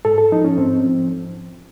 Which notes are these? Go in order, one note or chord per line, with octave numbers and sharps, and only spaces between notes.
G#2 A4
A4
F3 D#4
C#4
G#2 C4
F3